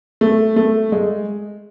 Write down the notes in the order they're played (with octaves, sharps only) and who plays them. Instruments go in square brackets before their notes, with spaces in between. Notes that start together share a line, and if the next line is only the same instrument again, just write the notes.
[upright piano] A3
A3
G#3